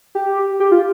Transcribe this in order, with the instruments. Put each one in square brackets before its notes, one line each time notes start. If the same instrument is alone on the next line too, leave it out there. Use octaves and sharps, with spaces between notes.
[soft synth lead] G4
G4
F4